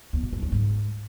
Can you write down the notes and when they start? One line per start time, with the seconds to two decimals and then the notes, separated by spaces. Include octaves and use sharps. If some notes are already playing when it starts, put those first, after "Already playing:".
0.13 E2
0.23 B2
0.33 G2
0.42 E2
0.52 G#2